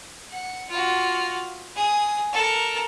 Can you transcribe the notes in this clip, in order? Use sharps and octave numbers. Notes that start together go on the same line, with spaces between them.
F#5
F4 F#4
G#4 D#6
A4 A#4